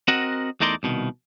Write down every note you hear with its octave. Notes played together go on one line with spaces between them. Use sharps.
C4 F#4 A#4 D#5 F#5
E2 A3 D#4 A#4 D5 C6
C2 B2 D#3